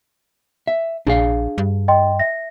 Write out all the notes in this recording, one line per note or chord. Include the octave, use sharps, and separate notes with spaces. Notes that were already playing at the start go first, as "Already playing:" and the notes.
E5
A#1 D4 G#4 F5
G2
D#5 G5 C6
E5 A#6